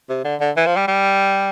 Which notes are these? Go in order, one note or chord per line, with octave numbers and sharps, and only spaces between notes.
C3
D3
D3
E3
F3
G3
G3